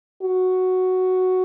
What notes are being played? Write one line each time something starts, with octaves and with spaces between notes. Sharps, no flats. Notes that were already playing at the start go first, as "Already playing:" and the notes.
F#4